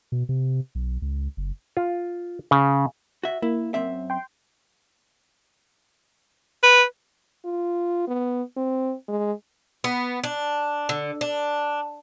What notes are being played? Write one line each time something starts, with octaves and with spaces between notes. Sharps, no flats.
B2
C3
B1
C#2
F#1
F4
C#3
F#4 E5
A#3 E4
F#2 C4 E5
G5 C6
B4
F4
B3
C4
G#3
B3
D4
D3
D4